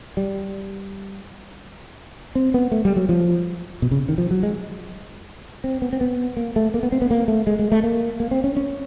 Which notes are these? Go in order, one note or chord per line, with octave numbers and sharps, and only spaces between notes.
G3
C4
B3
A3
G3
F#3
F3
B2
C#3
D#3
F3
F#3
G#3
C4
B3
C4
B3
A#3
A3
A#3
B3
C4
B3
A#3
A3
G#3
G#3
A3
A#3
A#3
C4
C#4
C#4